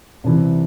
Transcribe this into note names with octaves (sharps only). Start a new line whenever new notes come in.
C2 C3 E3